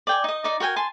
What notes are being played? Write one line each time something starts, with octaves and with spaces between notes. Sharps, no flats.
D5 G5 G#5
D#4 D#5
D#4 D5
F#4 A#4 G5 G#5
G#5 A5 C6